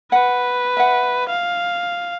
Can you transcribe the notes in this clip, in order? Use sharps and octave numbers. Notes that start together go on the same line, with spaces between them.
B4 F#5
E5 F#5
F5